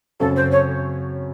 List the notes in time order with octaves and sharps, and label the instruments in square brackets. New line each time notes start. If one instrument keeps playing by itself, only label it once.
[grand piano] F#2 C#3 F#3 C4 [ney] A4
[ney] C5
C#5